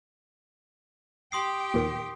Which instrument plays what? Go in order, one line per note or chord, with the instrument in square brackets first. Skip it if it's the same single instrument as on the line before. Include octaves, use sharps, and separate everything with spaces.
[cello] G4 G5 [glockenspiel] C6 D#6 C7
[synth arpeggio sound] D#2 A#2 D#3